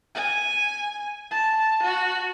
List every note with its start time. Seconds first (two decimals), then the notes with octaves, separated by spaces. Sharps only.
0.15 G#5
1.31 A5
1.83 F#4